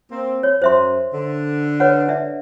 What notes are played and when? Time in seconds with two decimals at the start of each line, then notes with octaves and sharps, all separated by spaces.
0.11 A#3 C4
0.43 C#5
0.62 F#2 C5 E5 C6
1.14 D3
1.80 B4 C#5 F#5
2.08 D4 D5 E5